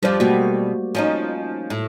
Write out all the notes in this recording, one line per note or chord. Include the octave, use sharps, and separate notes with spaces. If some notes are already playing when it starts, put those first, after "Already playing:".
F2 F3 G3 C5 D5
B2 G3 A3 A#3 F#4
F3 C#4 D#4
A2